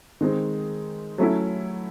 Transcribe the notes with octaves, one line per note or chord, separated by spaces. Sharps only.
D#3 G#3 C4 D#4
F#3 A3 C#4 E4